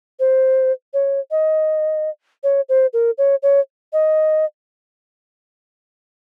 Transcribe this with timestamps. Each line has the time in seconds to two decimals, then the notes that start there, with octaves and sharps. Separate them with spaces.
0.20 C5
0.94 C#5
1.31 D#5
2.43 C#5
2.69 C5
2.93 A#4
3.18 C#5
3.43 C#5
3.93 D#5